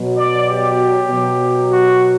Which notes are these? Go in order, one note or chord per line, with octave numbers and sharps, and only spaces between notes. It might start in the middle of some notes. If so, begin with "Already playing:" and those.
Already playing: B2 F#3
D5
G4
B2 F#3
F#4